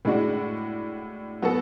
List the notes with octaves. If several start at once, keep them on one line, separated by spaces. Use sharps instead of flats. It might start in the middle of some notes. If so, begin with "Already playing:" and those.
A2 G#3 D4 F#4
F#3 B3 F#4 A4